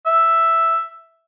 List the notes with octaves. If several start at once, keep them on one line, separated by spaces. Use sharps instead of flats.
E5